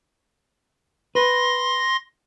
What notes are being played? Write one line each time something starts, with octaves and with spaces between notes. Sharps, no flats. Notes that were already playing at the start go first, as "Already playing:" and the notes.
B4 C6 A#6